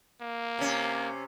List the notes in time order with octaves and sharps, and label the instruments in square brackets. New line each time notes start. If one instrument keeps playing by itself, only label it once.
[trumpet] A#3
[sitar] C3 C#4